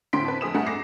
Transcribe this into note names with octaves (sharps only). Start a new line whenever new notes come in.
D2 A2 C4 C6 B6 D7
B4 A5
F1 G#4 D#6 E7
G2 A3 G#4 F#5 A#5
D6 A#6 C7